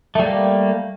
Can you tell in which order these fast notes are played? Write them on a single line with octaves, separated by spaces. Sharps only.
A3 G3 A#3